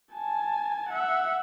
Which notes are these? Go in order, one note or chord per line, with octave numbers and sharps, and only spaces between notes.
G#5 A5
E5 F#5